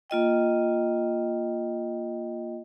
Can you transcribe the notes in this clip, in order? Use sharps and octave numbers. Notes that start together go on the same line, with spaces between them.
A#3 F4 D#5 G5